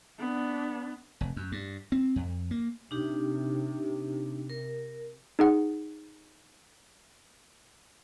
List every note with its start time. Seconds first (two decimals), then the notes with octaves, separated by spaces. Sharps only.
0.20 B3 D4
1.21 F1
1.36 F#2
1.52 G2
1.92 C4
2.16 F2
2.51 A#3
2.91 C3 D4 D#4 G4
4.50 A#4
5.39 D#4 G#4 F#5